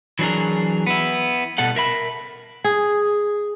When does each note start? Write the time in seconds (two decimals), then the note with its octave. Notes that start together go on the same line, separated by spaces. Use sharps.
0.19 E3 F#3 D4 G#4 A#4
0.87 B3 E4
1.58 B2 G3 A4 F#5
1.76 A#4 E5 B5
2.64 G#4